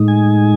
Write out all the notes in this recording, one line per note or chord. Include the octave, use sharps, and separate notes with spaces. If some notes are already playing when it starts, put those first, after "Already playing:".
Already playing: A2 G#3 D#4
G#5